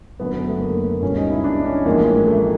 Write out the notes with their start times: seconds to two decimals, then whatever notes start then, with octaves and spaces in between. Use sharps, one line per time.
0.20 F#1 F#2 D3 B3
0.34 B3
0.47 A3
0.61 A#3
1.02 C#2 B2 G3 C#4
1.17 D#4
1.30 E4
1.44 D4
1.65 C#4
1.86 A1 A2 F3 G#3 A#3
2.27 A3